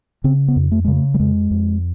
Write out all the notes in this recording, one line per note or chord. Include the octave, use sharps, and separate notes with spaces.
C#3 C4
B3
F2
A3
C#3 G#3
A3
G3
F2 G#3
F2